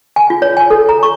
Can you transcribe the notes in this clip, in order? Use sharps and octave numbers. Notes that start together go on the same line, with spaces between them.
G#5
F4
C#5
G#5
A4
A#5
C#6